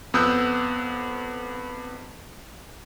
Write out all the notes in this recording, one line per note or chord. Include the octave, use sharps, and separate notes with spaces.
F2 B3 D#6 E6 F#6 G6